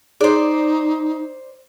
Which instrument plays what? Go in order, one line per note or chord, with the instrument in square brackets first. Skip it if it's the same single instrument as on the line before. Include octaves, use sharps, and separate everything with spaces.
[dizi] D#4 [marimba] G#4 [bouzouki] C5 D5